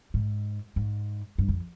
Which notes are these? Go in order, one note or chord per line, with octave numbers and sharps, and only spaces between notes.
G#2
G#2
G2
F2